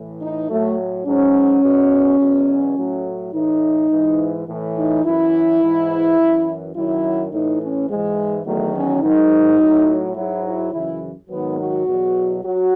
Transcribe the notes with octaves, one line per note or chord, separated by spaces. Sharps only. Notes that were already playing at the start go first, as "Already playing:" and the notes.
Already playing: A2 E3
D#4
A2 F#3 A3
G#2 F#3 C#4
E2 B2 F#3
E2 B2 F#3
A2 F#3
A2 E3 D#4
G#2 E3
A2 E3
D#4
F#2 E3 E4
G#2 E3
F#2 E3
F#2 D#3 F#3 E4
A2 E3 D#4
C#4
G#2 E3 G#3
E2 D#3 F#3 A3
C#4
G#2 D#3 F#3 D#4
A2 F#3
G#2 F#3 E4
E4
F#2 C#3 E3 E4
G#2 D#3 F#3 B3
F#4
E2 B2 F#3
F#3 F#4